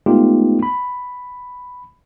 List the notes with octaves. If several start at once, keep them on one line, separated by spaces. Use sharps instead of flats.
G#3 A3 B3 D#4 F4 G4
B5